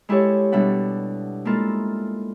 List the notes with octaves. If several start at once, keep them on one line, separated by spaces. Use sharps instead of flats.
G#3 E4 G4 A4 C#5
B2 G3 D4 E5 F#5
G#3 A#3 E4 F4 A4